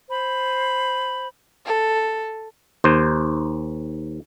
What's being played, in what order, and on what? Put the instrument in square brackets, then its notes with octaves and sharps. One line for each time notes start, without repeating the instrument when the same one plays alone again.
[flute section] C5 B5
[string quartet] A4
[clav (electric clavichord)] D#2 C5